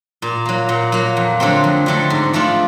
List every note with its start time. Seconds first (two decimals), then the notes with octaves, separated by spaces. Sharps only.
0.22 A#2
0.46 F#3 A#3
0.69 A#2
0.92 F#3 A#3
1.17 F2
1.40 D3 F#3 A3 C4
1.64 F2
1.86 D3 F#3 A3 C4
2.10 G#2
2.33 F3 A3 D4 F4